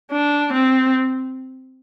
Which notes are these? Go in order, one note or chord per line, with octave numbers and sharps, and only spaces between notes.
D4
C4